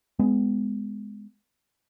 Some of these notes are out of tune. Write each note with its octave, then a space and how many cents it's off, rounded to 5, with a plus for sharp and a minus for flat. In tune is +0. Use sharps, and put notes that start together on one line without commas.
G#3 +0 B3 +25